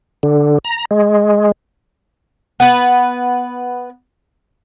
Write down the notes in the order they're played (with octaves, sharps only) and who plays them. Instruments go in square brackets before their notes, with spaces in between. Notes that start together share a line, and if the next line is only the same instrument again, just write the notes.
[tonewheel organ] D3
A#5
G#3
[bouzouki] B3 B4